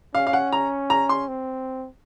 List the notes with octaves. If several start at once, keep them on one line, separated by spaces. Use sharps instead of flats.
C#4 F5
F5
F#5
A#5
A#5
C6
C4